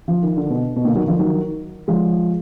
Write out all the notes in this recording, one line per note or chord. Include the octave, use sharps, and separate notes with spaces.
F3
D#3
D3
B2
B2
A#2 D3
D#3 F#3
D3 F3
D#3 F#3
F3 G#3